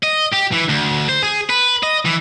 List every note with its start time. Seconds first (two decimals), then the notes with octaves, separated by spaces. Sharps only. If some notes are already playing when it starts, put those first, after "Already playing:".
0.03 D#5
0.33 G4
0.53 E3
0.69 D2
1.09 C5
1.23 G#4
1.50 B4
1.83 D#5
2.06 E3